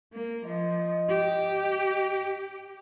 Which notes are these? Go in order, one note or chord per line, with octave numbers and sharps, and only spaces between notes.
A#3
F3 D#5
G4